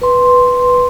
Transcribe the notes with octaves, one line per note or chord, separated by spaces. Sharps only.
B4 C6